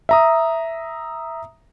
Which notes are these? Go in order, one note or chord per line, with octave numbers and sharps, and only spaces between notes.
E5 A#5 D#6